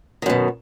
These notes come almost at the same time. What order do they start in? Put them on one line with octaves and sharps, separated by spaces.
D#3 F#2 B2